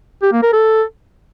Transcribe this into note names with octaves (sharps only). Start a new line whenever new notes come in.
G4
A#3
A#4
A4